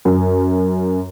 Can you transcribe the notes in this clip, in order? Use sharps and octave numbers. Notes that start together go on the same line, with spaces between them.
F#2